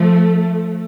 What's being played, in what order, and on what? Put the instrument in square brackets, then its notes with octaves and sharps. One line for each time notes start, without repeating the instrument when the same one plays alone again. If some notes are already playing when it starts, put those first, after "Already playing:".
Already playing: [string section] F3 A3